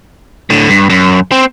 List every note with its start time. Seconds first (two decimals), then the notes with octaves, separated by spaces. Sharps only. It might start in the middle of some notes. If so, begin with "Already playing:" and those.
0.50 A2 D3
0.69 G2
0.90 F#2
1.32 C4